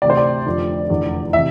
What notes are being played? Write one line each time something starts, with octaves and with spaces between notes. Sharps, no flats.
D2 C3 E3 D5
C5
D5
F1 F2 D3
F1 E2 D3
C3 E3 E5